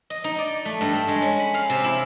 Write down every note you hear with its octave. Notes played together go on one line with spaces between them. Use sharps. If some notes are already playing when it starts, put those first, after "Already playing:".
D#5
D#4
D5
A3
G2
A3
G#3
C#4
B5
F5
C3
E4